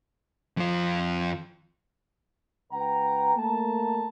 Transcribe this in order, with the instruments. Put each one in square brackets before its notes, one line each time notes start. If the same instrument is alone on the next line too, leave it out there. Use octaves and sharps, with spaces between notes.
[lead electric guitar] F2 F4
[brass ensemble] C#2 B4 F#5 G5 A#5
A3 A#3 A5 A#5